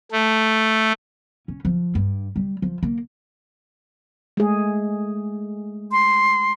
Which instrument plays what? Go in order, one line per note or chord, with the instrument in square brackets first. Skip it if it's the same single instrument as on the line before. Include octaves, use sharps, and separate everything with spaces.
[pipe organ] A3
[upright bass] C#4
F3
G2
G3
F3
A#3
[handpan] G#3 A3 G#4
[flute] C6